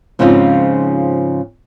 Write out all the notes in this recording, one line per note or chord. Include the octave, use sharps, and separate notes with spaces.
G#2 C#3 F3 C4 D#4 F4